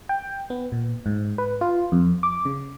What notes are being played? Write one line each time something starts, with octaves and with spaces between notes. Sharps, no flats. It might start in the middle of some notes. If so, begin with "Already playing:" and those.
G5
B3
A#2
G#2
B4
F4
F2
D6
C#3